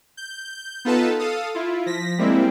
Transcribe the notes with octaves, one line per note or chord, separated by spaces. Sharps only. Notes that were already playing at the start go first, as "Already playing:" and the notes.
G6
B3 D#4 F4 A4 B4 A5
A4 F5 D#6
E4 F4
F3 A#6 B6
G3 G#3 A#3 C4 E4